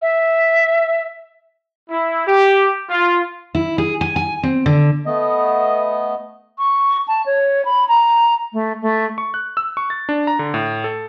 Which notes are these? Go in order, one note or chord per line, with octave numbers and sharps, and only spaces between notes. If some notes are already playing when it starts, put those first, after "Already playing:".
E5
E4
G4
F4
E4
G#4
G#5
G#5
C4
D3
A3 B3 D#5
C#6
A5
C#5
B5
A#5
A3
A3
C#6
F#6
E6
C#6
A6
D4
A#5
D3
A2
A4